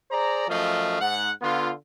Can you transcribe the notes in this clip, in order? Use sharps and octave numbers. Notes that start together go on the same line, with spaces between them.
G#4 C5 D5 A#5
F#2 F3 A3 D#5 F5
G#2 F#5
D3 B3 F4